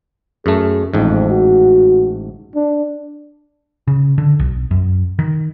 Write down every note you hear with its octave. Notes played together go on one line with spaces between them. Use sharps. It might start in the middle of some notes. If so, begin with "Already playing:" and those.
F#2 A3 G#4
A1 F2 G#2
F#4
D4
C#3
D3
B1
F#2
D#3